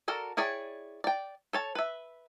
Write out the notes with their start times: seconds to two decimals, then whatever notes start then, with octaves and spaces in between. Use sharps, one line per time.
0.08 F#4 A4 A#4 D5
0.37 E4 G#4 C#5 D5 G5
1.04 D5 G5
1.53 A4 C#5 A5
1.75 B4 E5